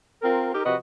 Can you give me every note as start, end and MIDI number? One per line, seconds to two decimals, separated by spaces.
0.22 0.51 60
0.22 0.51 65
0.22 0.51 70
0.53 0.65 63
0.53 0.65 67
0.53 0.65 70
0.65 0.75 48
0.65 0.75 53
0.65 0.75 66
0.65 0.75 71
0.65 0.75 75